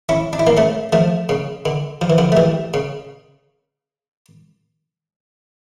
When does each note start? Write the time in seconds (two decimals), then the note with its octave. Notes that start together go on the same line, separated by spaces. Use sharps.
0.09 C#4 E4
0.33 D4
0.39 E4
0.47 A#3 D4
0.57 A3 C#4
0.93 F3 A3
1.29 C#3
1.66 D3
2.01 F3
2.10 E3
2.18 D3 F3
2.32 A3
2.37 E3 G3
2.74 C#3